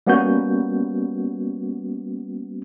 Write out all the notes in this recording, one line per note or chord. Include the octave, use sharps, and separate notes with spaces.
G3 A#3 B3 C#4 F#4 G6